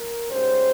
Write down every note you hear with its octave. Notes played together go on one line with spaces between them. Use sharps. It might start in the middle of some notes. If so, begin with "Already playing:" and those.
Already playing: A#4
G#2 G3 C#4 C5